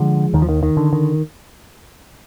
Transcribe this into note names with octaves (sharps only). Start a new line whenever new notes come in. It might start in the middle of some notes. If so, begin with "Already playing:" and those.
Already playing: D3 F3 G#3
D#2 D#3
F3
D#3
D#3
D3
D#3